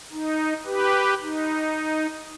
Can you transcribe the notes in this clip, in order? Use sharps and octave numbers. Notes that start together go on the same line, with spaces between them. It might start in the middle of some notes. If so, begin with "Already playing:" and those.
D#4
G4 B4
D#4